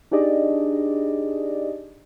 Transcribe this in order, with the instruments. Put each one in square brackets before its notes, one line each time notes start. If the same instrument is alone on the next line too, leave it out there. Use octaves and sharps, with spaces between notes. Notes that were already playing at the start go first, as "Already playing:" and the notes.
[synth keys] D4 D#4 G4 G#4 D5 D#5